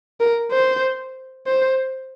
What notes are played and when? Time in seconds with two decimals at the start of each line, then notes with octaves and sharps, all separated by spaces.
0.20 A#4
0.51 C5
1.47 C5